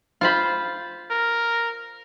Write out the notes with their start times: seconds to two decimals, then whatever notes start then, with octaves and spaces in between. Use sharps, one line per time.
0.21 F4 C5 B5
1.11 A#4